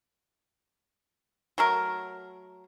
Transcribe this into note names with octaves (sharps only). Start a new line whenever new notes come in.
F#3 A3 A#4